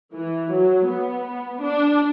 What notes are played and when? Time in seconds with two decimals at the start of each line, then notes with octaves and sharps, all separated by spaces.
0.14 E3
0.51 F#3
0.88 B3
1.62 D4